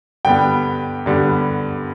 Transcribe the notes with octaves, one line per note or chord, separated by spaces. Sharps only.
G2 D3 G3 B3 G5
G2 D3 G3 B3